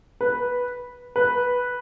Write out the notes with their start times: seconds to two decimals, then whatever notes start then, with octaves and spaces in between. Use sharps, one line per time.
0.21 B4
1.16 B4